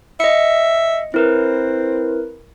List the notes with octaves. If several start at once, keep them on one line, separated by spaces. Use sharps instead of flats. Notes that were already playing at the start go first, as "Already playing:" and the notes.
D#5 E5 C#7
C4 E4 A#4 B4